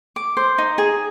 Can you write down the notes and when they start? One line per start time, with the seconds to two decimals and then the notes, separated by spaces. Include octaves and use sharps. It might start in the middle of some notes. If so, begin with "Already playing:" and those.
0.16 D6
0.37 C5
0.58 D#4
0.78 G#4